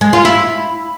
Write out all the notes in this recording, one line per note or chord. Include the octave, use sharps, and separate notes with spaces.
G#3
F4
E4